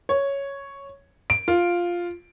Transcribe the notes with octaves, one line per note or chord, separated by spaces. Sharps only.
C#5
D7
F4